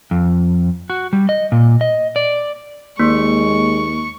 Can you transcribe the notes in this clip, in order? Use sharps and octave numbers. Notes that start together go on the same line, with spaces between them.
F2
F#4
G3
D#5
A#2
D#5
D5
D#2 G#3 A#3 C#6